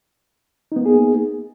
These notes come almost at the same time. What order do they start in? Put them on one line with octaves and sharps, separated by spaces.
D#4 B3 A#3 G#4